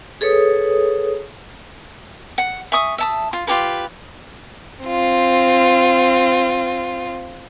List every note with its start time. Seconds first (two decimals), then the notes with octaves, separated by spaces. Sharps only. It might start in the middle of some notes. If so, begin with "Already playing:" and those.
0.21 G#4 A4 B4 C#5 D#6
2.38 F#5
2.72 E5 G#5 C#6 D#6
2.98 E5 A5 D#6
3.33 F4
3.47 F4 G4 A4 B4
4.84 C4 F4